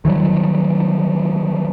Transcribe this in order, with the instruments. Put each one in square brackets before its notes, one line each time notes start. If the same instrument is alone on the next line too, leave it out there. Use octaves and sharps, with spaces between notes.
[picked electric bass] D#3 E3 F#3 G3